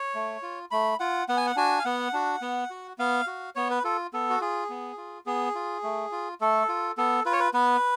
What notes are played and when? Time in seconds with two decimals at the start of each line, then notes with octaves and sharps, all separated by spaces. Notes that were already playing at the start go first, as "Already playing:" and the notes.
Already playing: C#5
0.15 A3
0.43 F4
0.71 A3 B5
1.00 F4 F#5
1.29 B3 F#5
1.37 G#5
1.47 F#5
1.56 D4 F#4 G#5
1.79 F5
1.85 B3 F#5
2.13 D4 F#4
2.41 B3
2.70 F#4
2.98 B3 F5
3.27 F#4
3.55 B3 C#5
3.70 B4
3.84 F4 A4
4.13 B3 A4
4.30 F#4
4.41 F4 G#4
4.69 B3
4.98 F4
5.26 B3 G#4
5.55 F4
5.83 A3
6.12 F4
6.41 A3 A4
6.69 F4
6.97 B3 A4
7.25 F4 B4
7.33 C#5
7.40 B4
7.54 B3 B4